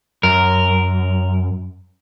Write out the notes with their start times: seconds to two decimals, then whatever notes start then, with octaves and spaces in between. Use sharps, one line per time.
0.23 F#2 A#4